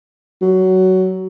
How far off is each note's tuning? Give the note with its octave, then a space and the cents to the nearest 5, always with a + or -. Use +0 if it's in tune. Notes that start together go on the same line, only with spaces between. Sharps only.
F#3 +15